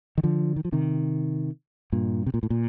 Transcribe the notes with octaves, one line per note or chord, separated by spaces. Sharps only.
D#3
D3 F3
D#3
F3
C3 D#3
G2 A#2
C3
A#2
A2
A#2